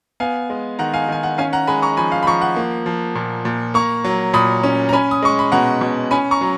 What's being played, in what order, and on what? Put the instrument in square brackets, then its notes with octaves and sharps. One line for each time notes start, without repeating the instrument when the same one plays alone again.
[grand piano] B3 F5 G#5
G#3
D#3 F#5 A#5
F5 G#5
D#3 G#5
F#5
C#4 F5 G#5
F#5 A#5
G#3 G#5 B5
A#5 C#6
F3 G#5 B5
F5
B5
F3 A#5 C#6
F#5
A#3
F3
A#2
A#2
A#3 A#5 C#6
F#3
A#2 B5 D#6
C#4
A#5
C#4 G#5 B5
D#6
G#3 C#6
B5
B2 F#5 A#5
B2
C#4 G#5 B5
A#5 C#6
F#3